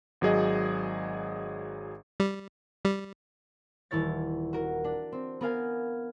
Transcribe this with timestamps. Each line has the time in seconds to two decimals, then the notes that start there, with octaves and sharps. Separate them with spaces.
0.21 G#1 F#3 G#4 D#5
2.20 G3
2.85 G3
3.91 D#1 E3 E4 C#5 A6
4.53 F#4 A#4
4.84 D4
5.12 C4
5.41 B3 A#4 F5 G#5